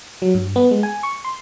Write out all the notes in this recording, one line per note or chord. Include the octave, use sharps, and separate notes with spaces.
F#3
G2
B3
G#3
G#5
C#6
C6